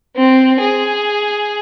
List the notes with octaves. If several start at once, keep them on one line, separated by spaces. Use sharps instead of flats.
C4
G#4